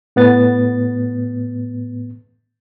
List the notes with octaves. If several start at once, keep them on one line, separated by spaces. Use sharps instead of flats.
A2 B3 A6